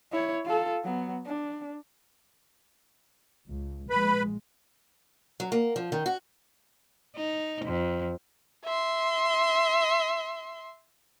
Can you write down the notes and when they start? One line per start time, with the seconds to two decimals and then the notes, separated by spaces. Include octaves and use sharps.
0.12 E4 C#5
0.45 F4 A4
0.84 F#3 B3
1.26 D4
3.49 C#2
3.90 A#1 G#3 B4 B5
5.40 F#3
5.52 A#3
5.76 F3
5.92 D#3
6.06 F#4
7.16 D#4
7.65 F2
8.64 E5 C6